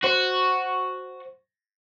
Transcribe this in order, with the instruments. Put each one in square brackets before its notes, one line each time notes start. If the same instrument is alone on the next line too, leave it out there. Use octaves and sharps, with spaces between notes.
[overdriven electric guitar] F#4 [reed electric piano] C5